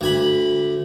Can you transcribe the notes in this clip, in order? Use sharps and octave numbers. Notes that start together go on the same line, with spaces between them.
D2 G#5 B5